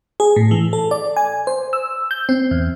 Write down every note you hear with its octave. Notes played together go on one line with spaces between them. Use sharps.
G#4
A2
E3
A4
D5
G#5
C5
E6
G6
C4
E2